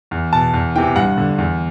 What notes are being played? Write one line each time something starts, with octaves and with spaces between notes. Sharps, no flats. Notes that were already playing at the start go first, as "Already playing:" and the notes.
E2
B2 A5
E2
C3 E3 G5
G2 F#5
D3
E2